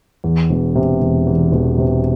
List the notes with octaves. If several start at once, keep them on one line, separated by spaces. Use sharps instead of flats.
E2
E1
C3
E1
E2
E1
C3